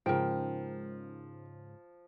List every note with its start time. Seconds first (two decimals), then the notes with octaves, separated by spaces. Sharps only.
0.06 G#2 C#3 F3 A#4 G5